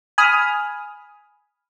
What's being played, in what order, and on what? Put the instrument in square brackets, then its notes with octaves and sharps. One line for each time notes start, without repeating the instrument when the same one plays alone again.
[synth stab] G#5 B5 D#6 F6